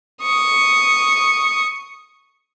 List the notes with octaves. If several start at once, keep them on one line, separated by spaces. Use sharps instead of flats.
C#6 D#6